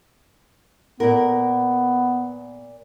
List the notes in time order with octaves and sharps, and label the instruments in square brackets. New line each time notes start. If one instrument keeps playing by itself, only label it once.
[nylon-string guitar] A#2 A#4 [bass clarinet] B3